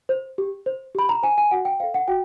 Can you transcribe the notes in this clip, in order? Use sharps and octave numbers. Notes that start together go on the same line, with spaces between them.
C5
G4
C5
G4 B5
A#5
C5 G#5
G#5
F#4 F#5
G5
A4 C5 F5
F#5
F#4 G5